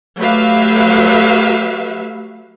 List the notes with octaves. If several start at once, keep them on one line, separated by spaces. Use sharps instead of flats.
F#3 A3 G4 B4 E5 F5